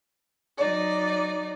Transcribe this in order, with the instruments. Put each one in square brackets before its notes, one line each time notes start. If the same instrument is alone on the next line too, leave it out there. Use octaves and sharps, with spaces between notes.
[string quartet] F#3 D#4 D5